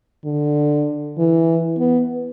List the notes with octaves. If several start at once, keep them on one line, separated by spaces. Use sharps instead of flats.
D3
E3
B3